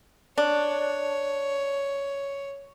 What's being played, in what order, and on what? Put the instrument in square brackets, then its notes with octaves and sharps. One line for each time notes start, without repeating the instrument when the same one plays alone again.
[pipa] D4 [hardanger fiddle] C#5